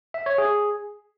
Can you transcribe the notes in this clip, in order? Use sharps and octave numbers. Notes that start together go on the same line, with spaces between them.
E5
C#5
G#4